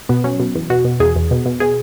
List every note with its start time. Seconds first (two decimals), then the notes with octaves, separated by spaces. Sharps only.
0.09 B2 B3
0.24 F#3 C#4
0.40 B2
0.55 E2
0.70 B2 F#4
0.85 B2
1.00 E2 G#4
1.16 E2
1.31 B2
1.46 B2
1.60 B2 G#4